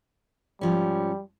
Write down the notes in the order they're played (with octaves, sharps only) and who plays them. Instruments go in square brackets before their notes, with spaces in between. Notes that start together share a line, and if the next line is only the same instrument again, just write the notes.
[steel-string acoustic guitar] G#2 F3 C#4 [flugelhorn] G3